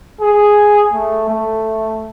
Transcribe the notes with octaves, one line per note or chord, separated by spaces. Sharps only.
G#4
A3
A3